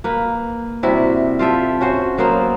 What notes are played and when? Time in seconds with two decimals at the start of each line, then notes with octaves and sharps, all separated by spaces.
0.04 A#3 B4
0.83 C3 G3 E4 F#4
1.39 F4 G4 A4 E5
1.81 C#4 F#4 C5
2.18 F#3 A#3 B3 C5